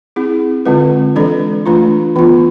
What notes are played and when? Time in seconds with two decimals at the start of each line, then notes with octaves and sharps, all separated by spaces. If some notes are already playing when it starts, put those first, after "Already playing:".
0.16 C4 E4 G#4
0.66 D3 G#3 C4 F4 B4
1.16 E3 G#3 D4 A4 D5
1.66 E3 A3 D4 F4
2.16 E3 B3 F4